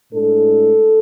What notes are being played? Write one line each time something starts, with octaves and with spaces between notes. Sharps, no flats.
A2 G#3 D4 A4